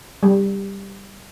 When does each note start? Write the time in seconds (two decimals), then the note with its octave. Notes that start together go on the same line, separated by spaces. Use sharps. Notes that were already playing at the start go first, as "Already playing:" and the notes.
0.23 G3